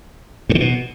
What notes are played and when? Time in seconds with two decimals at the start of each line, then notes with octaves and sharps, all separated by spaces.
0.49 G2
0.55 D#3
0.60 B2